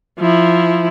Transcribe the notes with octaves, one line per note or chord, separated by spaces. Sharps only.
F3 E4